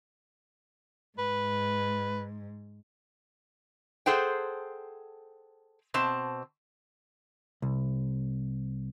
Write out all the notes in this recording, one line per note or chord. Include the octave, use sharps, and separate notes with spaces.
G#2 B4
G#4 A4 C5 F#5 G5
B2 C4 A5
C2